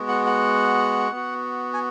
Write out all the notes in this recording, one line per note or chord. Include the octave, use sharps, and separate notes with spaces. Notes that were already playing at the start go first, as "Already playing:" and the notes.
Already playing: G#3 B3 F#4
F#5
F#5
B3 F#4
G#5